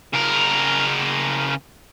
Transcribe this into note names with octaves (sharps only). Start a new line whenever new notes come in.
C#3 A#4